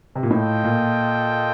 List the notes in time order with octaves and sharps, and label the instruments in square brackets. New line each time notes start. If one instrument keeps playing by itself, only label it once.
[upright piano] C3
A#2
[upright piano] A2 [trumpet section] F4 A4 D#5 G5
[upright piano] A#2